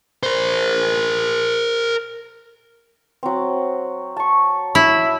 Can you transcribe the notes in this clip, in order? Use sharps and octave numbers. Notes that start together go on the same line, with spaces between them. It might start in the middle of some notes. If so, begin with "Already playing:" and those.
A#4 C5
F#3 C4
A5 C#6
E4